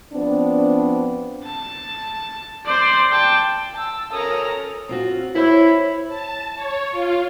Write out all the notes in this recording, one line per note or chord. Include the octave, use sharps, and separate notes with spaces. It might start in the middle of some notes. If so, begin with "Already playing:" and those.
F3 B3 C4 D4
A5
C5 D5
G5 A5
A5 E6
C#4 A4 A#4 A#5 D#6
C4 F4 F#4
E4 C5 C#5 E5
A5
C#5
F4